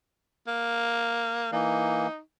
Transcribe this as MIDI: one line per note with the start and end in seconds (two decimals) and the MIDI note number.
0.47 1.50 58
1.52 2.07 52
1.52 2.07 58
1.52 2.19 63